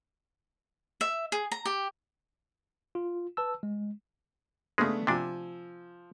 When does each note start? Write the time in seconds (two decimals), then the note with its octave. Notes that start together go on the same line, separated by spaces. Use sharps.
1.01 E5
1.32 G#4
1.52 A#5
1.66 G4
2.95 F4
3.37 B4 A5 E6
3.63 G#3
4.78 C#3 G#3 A3 B3 D4
5.07 C3 F3 D4 G#5 E6